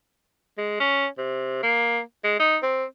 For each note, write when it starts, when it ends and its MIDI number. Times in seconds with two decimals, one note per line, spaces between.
0.58 0.79 56
0.80 1.07 61
1.18 1.59 48
1.63 2.01 58
2.24 2.35 56
2.39 2.57 63
2.63 2.85 60